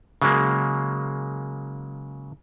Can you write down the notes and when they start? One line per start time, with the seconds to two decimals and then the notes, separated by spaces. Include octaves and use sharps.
0.22 C#3 F#3 G#3 A#3